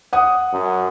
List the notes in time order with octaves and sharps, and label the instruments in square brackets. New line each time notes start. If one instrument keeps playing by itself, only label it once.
[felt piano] F#5 D#6
[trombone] F#2